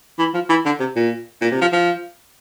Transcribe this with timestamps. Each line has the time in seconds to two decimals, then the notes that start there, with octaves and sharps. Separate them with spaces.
0.19 E3
0.34 F3
0.49 E3
0.65 D3
0.80 C3
0.96 A#2
1.41 A#2
1.51 C3
1.61 F3
1.72 F3